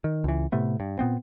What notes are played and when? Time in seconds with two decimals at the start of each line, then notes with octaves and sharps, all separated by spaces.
0.04 D#3
0.24 C#2 E3
0.52 A2 C3 A3 B3
0.80 G2
0.99 A#2 B3 C4